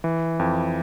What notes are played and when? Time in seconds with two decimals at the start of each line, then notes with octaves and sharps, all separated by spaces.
0.04 E3
0.39 F2